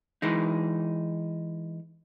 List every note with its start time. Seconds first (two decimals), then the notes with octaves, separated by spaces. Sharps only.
0.22 E3 G#3 D#4